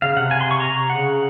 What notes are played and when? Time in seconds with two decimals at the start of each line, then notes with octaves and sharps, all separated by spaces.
0.02 C#3 F5
0.17 C3 F#5
0.31 G#5
0.41 C6
0.51 C#6
0.60 A#5
0.89 C#3 F#5